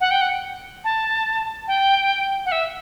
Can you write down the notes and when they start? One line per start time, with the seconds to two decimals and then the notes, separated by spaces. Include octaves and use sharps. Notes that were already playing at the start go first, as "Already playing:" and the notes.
0.01 F#5
0.11 G5
0.21 F#5
0.84 A5
1.68 G5
2.46 F#5
2.52 E5